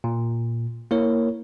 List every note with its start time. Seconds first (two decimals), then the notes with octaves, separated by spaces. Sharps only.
0.04 A#2
0.91 A#3 E4 A#4 C#5